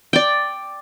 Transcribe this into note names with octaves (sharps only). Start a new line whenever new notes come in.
D5 G5